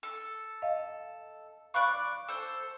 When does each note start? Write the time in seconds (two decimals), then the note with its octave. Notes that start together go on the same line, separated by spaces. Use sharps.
0.03 A4
0.62 D#5 F5
1.74 D5 F5 B5 C#6 F#6
2.29 A4 C5